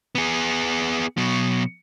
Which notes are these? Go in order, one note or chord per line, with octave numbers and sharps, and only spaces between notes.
B3 G#4
B2 F#3